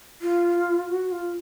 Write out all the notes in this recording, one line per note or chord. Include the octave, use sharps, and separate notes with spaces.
F4
F#4
F4